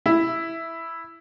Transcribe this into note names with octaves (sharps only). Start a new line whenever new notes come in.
E4